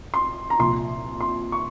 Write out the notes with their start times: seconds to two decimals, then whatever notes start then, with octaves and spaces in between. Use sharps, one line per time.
0.14 C6
0.50 A#5
0.59 C2 A#2 F3 C6
1.21 C6
1.52 C#6